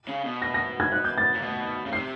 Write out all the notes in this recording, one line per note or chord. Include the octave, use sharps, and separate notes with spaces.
C#3
B2
A#6
A#6
G#6
F#6
G6
A6
A#2
B2
C#3
C3 C7